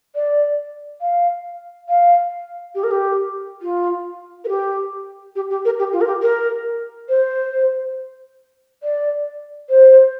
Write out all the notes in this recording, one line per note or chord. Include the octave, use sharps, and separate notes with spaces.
D5
F5
F5
G4
A#4
G4
F4
A#4
G4
G4
G4
A#4
G4
F4
A#4
G4
A#4
C5
D5
C5